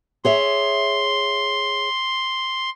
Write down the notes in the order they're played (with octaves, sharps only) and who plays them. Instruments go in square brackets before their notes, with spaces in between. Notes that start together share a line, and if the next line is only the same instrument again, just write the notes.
[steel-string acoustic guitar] G#4 C#5 E5 [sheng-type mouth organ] C6